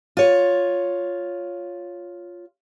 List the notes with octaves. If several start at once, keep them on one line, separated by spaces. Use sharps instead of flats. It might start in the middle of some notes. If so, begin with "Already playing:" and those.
F4 C#5